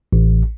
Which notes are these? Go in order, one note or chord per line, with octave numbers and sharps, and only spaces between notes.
A1